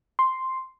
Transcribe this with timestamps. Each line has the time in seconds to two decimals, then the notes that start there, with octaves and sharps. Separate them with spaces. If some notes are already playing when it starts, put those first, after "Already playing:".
0.19 C6